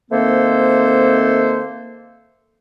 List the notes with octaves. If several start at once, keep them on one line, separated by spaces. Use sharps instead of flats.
D#3 A3 A#3 C4 A4 C5